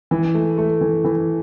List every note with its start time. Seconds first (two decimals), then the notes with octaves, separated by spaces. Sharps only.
0.11 E3
0.34 A3
0.58 A3
0.81 E3
1.04 E3